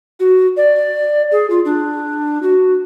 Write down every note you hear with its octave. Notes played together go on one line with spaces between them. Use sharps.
F#4
D5
G#4
F4
D4
F#4